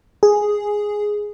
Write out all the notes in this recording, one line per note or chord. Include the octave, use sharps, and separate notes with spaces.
G#4